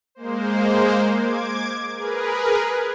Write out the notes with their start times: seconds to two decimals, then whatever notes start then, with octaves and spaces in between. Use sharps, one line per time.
0.15 G#3 A#3 C5
1.12 D6 G#6
1.92 G#4 A#4 B4